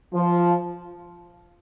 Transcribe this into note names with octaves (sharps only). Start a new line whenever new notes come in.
F3